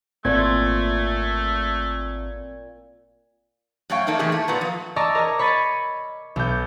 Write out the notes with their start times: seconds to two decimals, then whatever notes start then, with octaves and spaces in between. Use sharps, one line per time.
0.25 G#1 A#2 A3 C4 G#6
3.90 F#2 A3 C#5 F5 G5
4.07 A3 A#3 D4 D#4
4.19 A2 C3 E3 A#3 G4 G#4
4.32 A3
4.48 A#2 D3 B3 A#5
4.61 F3
4.96 D5 D#5 A5 A#5 C#6 E6
5.15 A#4 C#5 D#5 A#5
5.39 C#5 B5 C#6 A6 C#7 D#7
6.36 B1 G6